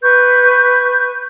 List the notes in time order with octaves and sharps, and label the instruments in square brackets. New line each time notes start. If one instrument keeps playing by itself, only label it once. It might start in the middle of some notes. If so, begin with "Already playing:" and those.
[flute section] B4 C#6 G6